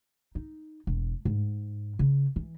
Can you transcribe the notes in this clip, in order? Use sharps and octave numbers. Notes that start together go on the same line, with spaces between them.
D#4
E1
G#2
C#3
E3